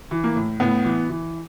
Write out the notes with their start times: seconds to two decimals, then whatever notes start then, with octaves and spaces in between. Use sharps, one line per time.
0.11 E3
0.24 A#3
0.36 A2
0.60 A2 B3
0.85 E3
1.09 E3